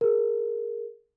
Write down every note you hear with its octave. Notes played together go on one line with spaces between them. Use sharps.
G#4 A#4